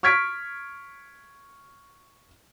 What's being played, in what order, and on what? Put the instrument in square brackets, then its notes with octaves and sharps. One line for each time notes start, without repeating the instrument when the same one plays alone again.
[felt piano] C#6 F6 G#6 B6 D7